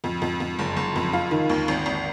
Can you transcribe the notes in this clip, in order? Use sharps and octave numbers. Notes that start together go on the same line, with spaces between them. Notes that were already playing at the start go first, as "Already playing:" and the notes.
F2
F2
F2
F#1
F#1
F2
F4
D#3
D#2
G#1
G#1